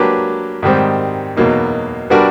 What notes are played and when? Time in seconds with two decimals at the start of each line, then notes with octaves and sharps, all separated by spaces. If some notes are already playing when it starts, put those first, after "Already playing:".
Already playing: F#3 A#3 D4 G4 B4
0.63 G#2 D#3 G3 C4
1.37 E2 B2 F#3 A#3 D#4
2.10 G3 B3 D4 F#4 A#4